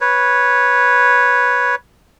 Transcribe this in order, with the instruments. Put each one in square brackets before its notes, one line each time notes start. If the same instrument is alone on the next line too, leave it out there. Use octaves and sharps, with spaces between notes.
[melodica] B4 C#5